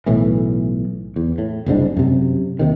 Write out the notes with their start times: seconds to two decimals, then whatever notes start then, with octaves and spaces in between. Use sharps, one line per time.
0.06 B1 A2 E3
1.16 E2
1.38 A2
1.66 F#1 C2 G#2 D4
1.97 F#2 C3
2.59 D#2 C3 D#3